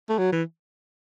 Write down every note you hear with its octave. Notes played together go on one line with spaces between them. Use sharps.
A3
F#3
E3